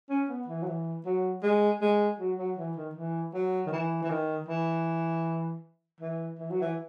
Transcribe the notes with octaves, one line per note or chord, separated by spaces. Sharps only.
C#4
B3
E3
F#3
E3
F#3
G#3
G#3
F#3
F#3
E3
D#3
E3
F#3
D#3
E3
E3
D#3
E3
E3
E3
F#3
E3